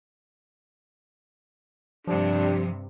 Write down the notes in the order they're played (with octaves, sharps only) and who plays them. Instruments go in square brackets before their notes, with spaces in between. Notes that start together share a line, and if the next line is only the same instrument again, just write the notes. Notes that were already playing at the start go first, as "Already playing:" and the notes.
[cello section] G2 C3 [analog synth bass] F3 [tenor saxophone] D4 [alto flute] G4